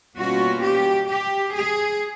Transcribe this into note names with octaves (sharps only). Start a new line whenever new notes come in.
B2 G3 A#3 C#4 F4 F#4
G4
G4
G#4